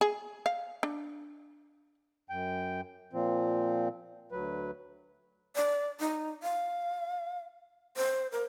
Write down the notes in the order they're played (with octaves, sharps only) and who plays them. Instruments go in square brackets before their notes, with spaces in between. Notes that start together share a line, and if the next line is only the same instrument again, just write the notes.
[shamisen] G#4
F5
D4
[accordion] F#2 G5
A#2 F3 C4
D2 F#3 B4
[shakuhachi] D5
D#4
F5
C5
A#4